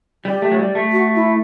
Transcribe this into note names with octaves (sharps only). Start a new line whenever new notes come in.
G3 G4
A3
F#3
G3
A3
F#4
E4